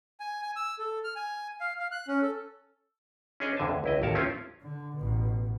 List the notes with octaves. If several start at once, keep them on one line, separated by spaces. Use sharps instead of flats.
G#5
G#5
E6
A4
F6
G#5
F5
F5
F#6
C#4
A4
C#4 D4 G#4 C#5 D#5
F2 D3 G#5 A5
D2
C#2 E4 D#5
A1 D#2 A#4 C#5 A5
A3 C4 C#4 E4 F4
D3
A1 B2